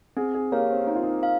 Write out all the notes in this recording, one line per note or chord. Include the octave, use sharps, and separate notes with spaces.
C4 G#4
G#4
A#3 G4 C#5 F5
C4
C4 D#4
F4
D#4
F5